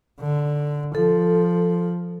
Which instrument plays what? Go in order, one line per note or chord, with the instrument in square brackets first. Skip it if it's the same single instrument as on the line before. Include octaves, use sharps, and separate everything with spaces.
[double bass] D3
[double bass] F3 [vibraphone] A4